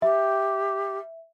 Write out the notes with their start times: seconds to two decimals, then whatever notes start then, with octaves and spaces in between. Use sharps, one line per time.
0.02 G4 E5